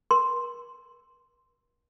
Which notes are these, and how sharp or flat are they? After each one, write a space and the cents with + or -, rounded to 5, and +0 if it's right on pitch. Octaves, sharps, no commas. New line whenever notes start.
A#4 +45 C6 +0